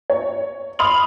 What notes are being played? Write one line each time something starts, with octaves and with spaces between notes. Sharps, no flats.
C#5
B5 C6 D#6 F6 F7 F#7